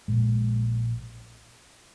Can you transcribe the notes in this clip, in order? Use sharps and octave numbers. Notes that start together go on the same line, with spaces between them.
A#1 A#2 G#3